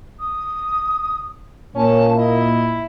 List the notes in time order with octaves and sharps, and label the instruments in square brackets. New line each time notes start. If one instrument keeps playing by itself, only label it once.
[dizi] D#6
[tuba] A#2 [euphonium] A#3 [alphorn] C#4 [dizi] A5
[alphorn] E4 [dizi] D#5